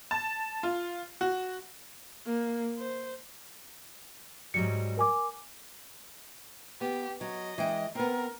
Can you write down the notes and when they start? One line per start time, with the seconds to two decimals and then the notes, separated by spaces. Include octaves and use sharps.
0.11 A5
0.63 F4
1.21 F#4
2.26 A#3
2.79 C5
4.54 G#2 F#3 G3 C#7
4.97 A#4 G#5 D6
6.81 B3 G4
7.21 F#3 D#5
7.58 E3 G#3 G5
7.95 B3 C4 A#4